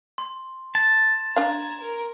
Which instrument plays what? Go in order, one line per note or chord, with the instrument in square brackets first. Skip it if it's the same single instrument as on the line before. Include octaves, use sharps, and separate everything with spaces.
[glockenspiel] C6
[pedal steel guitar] A5
[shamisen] D4 F5 [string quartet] A#5 G#6
[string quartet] A#4